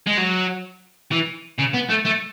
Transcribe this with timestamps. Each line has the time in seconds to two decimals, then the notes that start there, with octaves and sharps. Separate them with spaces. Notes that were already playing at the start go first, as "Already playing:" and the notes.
0.07 G#3
0.18 F#3
1.11 E3
1.58 C#3
1.73 B3
1.89 A3
2.05 A3